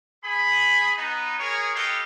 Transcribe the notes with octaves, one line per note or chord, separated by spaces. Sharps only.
G#4 B5
B3 D#4
G#4 A#4 C#5
G4 A4 B4 C#5 D#5 F5